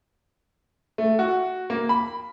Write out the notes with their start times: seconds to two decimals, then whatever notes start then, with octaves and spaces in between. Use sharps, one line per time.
0.98 A3
1.19 F#4
1.70 A#3
1.89 B5